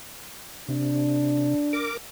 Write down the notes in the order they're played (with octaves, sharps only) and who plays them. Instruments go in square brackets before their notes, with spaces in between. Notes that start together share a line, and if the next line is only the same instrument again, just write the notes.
[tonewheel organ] C3 [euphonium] D4
[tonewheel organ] A#4 D6